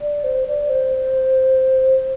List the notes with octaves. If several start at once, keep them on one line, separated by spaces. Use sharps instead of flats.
D5
C5
D5
C5